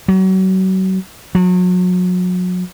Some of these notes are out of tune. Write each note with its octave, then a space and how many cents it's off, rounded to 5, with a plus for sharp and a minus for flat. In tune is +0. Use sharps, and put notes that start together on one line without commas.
F#3 +35
F#3 -35